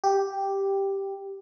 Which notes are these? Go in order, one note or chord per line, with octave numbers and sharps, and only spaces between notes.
G4